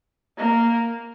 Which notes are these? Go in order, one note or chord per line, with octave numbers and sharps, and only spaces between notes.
A#3